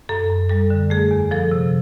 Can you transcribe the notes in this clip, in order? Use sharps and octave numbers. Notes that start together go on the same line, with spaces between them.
F#2 A4
F#2
G3 A4
D3
A3 G#4
E2
F3 A4
C3